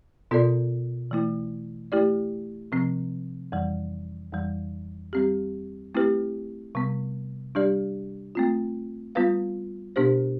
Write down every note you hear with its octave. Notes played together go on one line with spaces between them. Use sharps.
B2 B3 F4 A4 D5
E3 A3 E4
A3 E4 G4 D5
C3 F3 C4
F2 E3 G3
F2 E3 G3
G3 C4 G4
A3 C4 E4 G4 B4
C3 G3 B3
G3 D4 G4 D5
A3 C4 F4
G3 B3 F4 B4 F5
B2 B3 D4 G4 C5